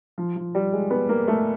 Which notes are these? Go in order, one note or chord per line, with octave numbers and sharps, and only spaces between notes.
F3
F3
G3
G#3
B3
A#3
A3